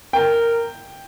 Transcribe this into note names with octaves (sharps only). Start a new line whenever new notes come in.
A#4 G5